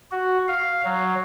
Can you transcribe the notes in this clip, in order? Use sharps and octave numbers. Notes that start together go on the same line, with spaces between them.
F#4
F5
F#3